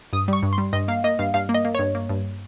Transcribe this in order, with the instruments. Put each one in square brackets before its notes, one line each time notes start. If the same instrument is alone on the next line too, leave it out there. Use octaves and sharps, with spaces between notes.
[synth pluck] G2 D#6
G3 C#6
G2
C6
G3
G2 D#5
A#3 F5
A#3 D#5
G2 F5
G2 F5
A#3
D#5
A#3
G2 C#5
A#3
G2